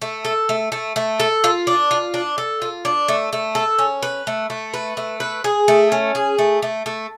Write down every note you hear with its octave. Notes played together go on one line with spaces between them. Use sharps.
A3
A4
A3
A3
A3
A4
F4
D4
F4
D4
A4
F4
D4
A3
A3
A4
C#4
B4
A3
A3
B4
A3
B4
G#4
A3
C#4
G#4
A3
A3
A3